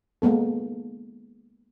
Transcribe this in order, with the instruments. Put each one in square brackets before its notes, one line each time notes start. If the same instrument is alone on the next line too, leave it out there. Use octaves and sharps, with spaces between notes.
[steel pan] G#3 A#3 B3 A4